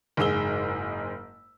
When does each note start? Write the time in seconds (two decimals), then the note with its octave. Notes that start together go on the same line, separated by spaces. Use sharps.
0.17 F#1 G#2 G#4 E6 G7